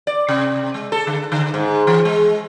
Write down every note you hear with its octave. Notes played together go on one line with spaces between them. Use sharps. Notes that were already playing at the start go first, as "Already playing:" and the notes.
D5
C3
G#3
A4
D3
D3
G#2
E3
G#3